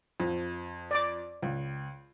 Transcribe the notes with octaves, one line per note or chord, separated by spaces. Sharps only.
F2
D5 D6
C#2